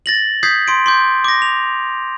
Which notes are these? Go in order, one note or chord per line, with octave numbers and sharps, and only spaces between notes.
A6 A#6 F#7
D#6 G6 G#6 B6 C7
C6 D7
C6 D6 G6
D6 A#6
F7